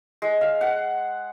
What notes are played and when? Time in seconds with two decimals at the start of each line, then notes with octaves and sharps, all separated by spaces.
0.22 G#3
0.41 F5
0.61 F#5